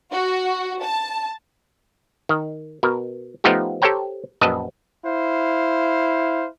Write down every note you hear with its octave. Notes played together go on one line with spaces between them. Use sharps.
F#4
A5
D#3
B2 A#4
F3 A3 B3 D#4 F4 G4
G4 A4 C5 C#5 G5 A#5
A#1 F#2 B4 D#5 A5
E4 C5 F5